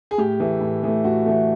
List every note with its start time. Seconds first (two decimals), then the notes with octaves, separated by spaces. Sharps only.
0.11 G#4
0.18 A2 G4
0.40 E3 A3
0.61 A2
0.83 E3 A3
1.04 A2 F#4
1.26 E3 A3